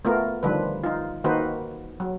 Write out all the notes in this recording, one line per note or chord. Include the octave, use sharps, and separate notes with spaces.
A3 B3 F4 A#4
D3 D#3 F3 G3 B4
D#4 F4
D#3 A#3 D#4 F#4 B4 C5
F#3